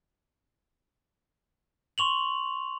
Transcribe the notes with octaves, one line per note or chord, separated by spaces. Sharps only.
C6 C#6 F7 F#7